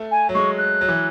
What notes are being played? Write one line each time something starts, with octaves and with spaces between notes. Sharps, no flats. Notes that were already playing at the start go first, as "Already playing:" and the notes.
Already playing: A3
G#5
F#3
G#3 C#6
F#6
F#3
E3